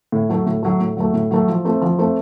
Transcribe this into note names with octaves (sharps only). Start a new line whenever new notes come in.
A2
F#3 A3
A2
F#3 A3
A2
F#3 A3
A2
F#3 A3
F3
A3 C4
F3
A3 C4